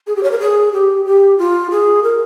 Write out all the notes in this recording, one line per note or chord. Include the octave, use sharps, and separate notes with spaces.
G#4
G4
C#5
A#4
G#4
G4
G4
F4
G#4
A#4